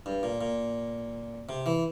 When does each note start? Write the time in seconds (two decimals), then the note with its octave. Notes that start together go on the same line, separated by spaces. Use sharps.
0.06 G2
0.23 A#2
0.41 A#2
1.49 C3
1.66 E3